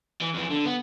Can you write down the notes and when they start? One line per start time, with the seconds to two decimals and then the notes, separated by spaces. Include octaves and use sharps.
0.21 E3
0.34 F2 E3
0.50 D3
0.65 B3